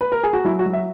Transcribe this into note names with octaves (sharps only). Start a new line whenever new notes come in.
B4
A#4
G#4
F#4
F#3 E4
F#4
F#3
E5